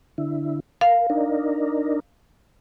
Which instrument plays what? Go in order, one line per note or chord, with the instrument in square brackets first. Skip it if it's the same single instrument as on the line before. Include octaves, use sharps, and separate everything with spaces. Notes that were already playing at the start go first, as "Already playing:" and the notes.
[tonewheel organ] D3 E4
[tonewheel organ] A#4 [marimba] F5
[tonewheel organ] D4 D#4 A#4